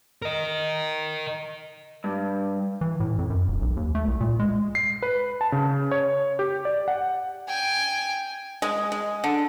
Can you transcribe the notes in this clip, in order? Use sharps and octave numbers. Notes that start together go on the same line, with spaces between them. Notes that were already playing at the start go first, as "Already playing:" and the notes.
A#4 D#5
G2
E3
A2
F2
F#2
D#1
B1
D#2
A3
C2
A#2
G#3
C7
B4
A5
C#3
C#5
G4
D5
F#5
G5 G#5
G#3
G#3
D3